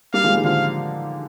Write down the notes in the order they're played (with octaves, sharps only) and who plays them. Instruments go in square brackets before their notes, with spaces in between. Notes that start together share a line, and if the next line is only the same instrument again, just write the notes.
[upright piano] G3 A#3 [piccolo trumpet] F5
[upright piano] F3 G#3
D#3 G3
[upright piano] D3 F3 [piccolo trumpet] F5